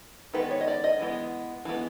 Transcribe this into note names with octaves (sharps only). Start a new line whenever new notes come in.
D#3 G#3 B3 D#4 B4
D5
C#5
D#5
D5
D#5
E3 G#3 B3
E3 G#3 B3